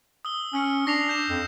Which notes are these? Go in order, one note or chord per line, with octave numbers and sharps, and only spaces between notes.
D#6 E6 G7
C#4 E6 F6 C#7
D4 A#6 C7 F7
G6 E7
F2